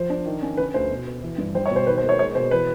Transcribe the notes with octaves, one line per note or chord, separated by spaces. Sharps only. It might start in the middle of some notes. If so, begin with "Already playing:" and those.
Already playing: F3 C5
D4
D#3
C#4
D3 B4
D2 C5
B2
B3
E3
G2
G3 C5
C#5
B2
C5
D#3 B4
C5
A#3
C#5
G#3 C#5
B2 C5
E3 B4